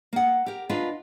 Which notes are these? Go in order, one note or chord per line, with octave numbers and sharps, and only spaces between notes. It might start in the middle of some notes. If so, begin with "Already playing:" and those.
A#3 F#5
G4 A#4
D4 F4 A#4 B4 D#5 F5